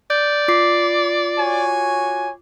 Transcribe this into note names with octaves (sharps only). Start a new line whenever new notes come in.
D5 G6
F4 D6 C7
F#4 C#5 G#5